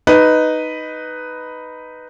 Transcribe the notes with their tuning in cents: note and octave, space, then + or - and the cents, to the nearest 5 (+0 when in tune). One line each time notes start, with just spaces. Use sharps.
D#4 +0 B4 +5 D#5 +0